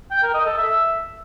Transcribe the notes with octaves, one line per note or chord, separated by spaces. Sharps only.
G5
A#4
D#5
A4
E5